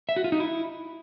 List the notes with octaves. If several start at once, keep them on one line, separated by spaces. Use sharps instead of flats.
E5
F#4
F4
D#4
E4